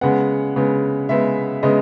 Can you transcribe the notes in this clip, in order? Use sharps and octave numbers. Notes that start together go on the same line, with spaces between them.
C#3 G#3 B3 F#5
C#3 G#3 B3
C#3 G#3 B3 E5
C#3 G#3 B3 D#5